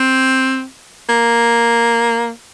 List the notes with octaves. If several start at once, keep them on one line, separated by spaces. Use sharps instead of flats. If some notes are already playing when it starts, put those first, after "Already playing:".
Already playing: C4
A#3